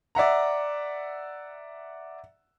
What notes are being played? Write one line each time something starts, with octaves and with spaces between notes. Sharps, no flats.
D5 E5 F#5 A#5